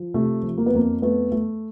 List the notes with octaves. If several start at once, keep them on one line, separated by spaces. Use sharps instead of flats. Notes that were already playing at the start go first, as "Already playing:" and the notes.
Already playing: F3
C3 A3
F3
A#3
B3
F2 A#3
A3 B3
A3